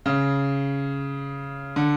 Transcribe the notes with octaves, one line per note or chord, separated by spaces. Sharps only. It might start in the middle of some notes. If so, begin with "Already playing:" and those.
C#3
D3